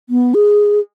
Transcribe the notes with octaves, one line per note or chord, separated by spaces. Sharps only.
B3
G#4